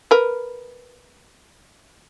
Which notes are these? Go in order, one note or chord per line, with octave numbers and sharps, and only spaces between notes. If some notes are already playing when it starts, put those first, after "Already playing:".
A#4 B4